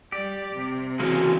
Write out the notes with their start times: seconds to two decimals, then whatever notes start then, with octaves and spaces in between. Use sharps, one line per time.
0.12 G3 G4 D5
0.53 C3
1.00 C#3 E3 G#3 A#3 C#4 F#4